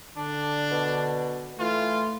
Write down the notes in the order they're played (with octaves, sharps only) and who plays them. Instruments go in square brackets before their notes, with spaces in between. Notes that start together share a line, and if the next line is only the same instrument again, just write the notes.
[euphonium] D3 [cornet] D4
[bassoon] B2
[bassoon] E3 [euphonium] A3 [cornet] F4